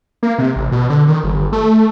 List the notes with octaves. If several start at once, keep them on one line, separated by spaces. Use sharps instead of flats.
A#3
C3
A1
B2
D3
D#3
G1
A3